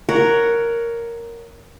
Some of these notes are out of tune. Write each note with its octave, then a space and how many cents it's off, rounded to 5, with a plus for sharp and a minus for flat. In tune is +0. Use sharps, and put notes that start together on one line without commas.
A#4 +0 C#5 +10 F#5 +0